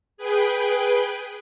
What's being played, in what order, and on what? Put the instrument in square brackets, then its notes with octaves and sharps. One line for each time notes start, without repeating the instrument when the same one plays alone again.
[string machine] G#4 B4 G5